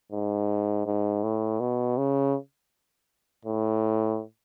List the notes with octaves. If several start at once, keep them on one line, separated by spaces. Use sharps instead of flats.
G#2
G#2
A2
B2
C#3
A2